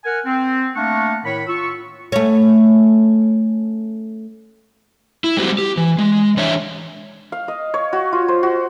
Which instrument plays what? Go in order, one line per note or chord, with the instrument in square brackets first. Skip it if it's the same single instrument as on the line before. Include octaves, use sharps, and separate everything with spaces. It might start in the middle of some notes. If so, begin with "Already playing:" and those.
[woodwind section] A#4 F#5 G#5
C4
A3 A#3 D4 A#4 F#5 C#6
A2 D#3 C#5 B5
F4 C#6 E6
[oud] A3 C#4
[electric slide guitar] E4
G3 G#3 C4 F#4 G4
G4
E3
G#3
E3 D4 C#5 E5
[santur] F5
D#5
C#5
F#4
F4
C5
F#4